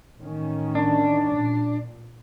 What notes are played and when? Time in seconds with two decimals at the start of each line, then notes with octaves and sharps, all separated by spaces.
0.19 A1 D#3 C#4
0.75 D4
1.34 A#2